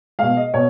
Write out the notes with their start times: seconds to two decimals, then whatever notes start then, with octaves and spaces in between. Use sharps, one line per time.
0.19 B2 G#3 F5
0.37 D#5
0.54 B2 C#5